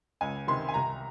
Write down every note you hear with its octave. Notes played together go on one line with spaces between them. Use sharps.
C#2 G#5
C3 D#3 C6
G#5
C2 A#5